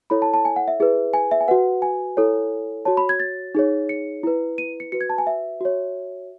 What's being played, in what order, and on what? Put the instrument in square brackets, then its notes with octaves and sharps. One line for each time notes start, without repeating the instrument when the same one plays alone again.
[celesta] E4 A4 C#5 B5
A5
A5
G#5
F#5
E5
E4 G#4 B4
G#5
E5
G#5
F#4 B4 F#5
G#5
E4 A4 C#5
F#4 C#5 A5
B5
G#6
A6
D#4 G#4 C#5
C#7
E4 B4
D#7
C#7
F#4 B4 C#7
G#6
A5
G#5
E5
F#4 C#5